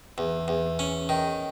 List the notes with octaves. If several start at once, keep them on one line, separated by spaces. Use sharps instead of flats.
E2
E2
C#4
D#3